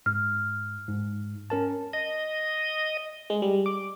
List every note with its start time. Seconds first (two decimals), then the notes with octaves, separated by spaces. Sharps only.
0.06 G#2 F6
0.88 G#2
1.50 C#4 A#4 A5
1.93 D#5
3.30 G#3
3.42 G3
3.66 D6